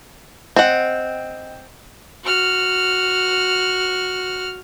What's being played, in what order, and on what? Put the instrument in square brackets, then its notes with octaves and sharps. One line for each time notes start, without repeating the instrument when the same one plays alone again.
[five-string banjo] C4 F#5 [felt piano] D#5 G5
[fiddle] F#4 F6